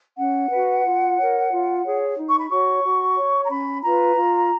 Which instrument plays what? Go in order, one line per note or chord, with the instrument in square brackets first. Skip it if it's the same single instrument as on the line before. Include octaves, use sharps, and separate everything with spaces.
[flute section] C#4 F#5
F#4 B4
F4
A#4 C#5
F4
G#4 C#5
D#4
C#6
B5
F#4 C#5 C#6
F#4
C#5
A#5
C#4 B5
F4 B4 A#5
F4